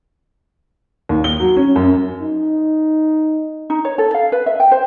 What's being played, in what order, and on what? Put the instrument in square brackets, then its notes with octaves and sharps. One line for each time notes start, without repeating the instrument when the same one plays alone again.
[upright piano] D#2
G7
F#3
C#4
F#2
[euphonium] D#4
[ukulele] D#4
C#5
A4
F5
B4
E5
G5
C5